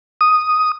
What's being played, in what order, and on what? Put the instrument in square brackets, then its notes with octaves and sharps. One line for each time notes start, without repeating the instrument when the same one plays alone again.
[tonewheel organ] D#6